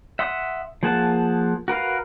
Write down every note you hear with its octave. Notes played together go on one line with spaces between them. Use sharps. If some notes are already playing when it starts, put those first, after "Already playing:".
E5 F#5 C6 D#6
F3 A#3 G#4 F#5 A5
F#4 A#4 B4 F5